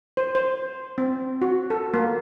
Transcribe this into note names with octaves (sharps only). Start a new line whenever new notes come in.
C5
C5
C4
F#4
A4
A#3